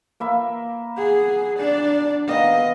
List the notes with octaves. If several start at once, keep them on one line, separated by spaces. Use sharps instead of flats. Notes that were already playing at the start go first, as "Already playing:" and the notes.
A#3 E5 B5
G#4 F#5
D4 D5
D#3 B3 D#5 F5